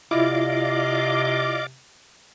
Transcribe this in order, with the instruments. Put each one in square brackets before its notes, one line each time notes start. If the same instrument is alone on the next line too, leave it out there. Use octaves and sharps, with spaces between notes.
[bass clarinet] C3 [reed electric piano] E4 F4 [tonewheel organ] D5 F5 D6 [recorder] D#5